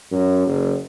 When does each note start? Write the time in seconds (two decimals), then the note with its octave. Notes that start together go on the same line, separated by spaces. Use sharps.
0.11 F#2
0.47 F#1